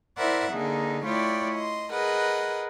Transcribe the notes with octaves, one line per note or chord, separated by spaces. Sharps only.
E4 A#4 C5 D5 E5 F#5
D3 A#3 D#4 G#4
A3 E4 F4 C#5 D5 G5
D#5 C6
G#4 A#4 B4 D#5 F#5